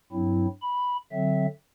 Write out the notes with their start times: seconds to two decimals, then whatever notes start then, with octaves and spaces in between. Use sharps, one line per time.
0.12 G2 F#3 C4 E4
0.62 B5
1.12 D3 F#3 C4 E5